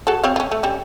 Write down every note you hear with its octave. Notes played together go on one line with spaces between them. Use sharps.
F#4 G#4 A4
C4 C#5 F5
C#4 F4
A3
G3 C#4